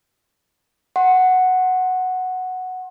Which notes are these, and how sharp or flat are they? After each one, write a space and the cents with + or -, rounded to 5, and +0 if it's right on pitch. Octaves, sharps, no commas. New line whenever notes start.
F#5 +0 C6 +30